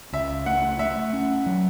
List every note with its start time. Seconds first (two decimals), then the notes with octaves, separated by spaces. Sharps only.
0.13 C#2 E5
0.46 A3 F#5
0.79 A3 E5
1.13 C#4
1.46 F#3